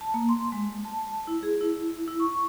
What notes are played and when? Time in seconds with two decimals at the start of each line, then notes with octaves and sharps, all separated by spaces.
0.01 A5
0.14 A#3
0.29 C6
0.52 G#3
0.85 A5
1.27 E4
1.43 G#4
1.61 E4
2.08 E4
2.20 C#6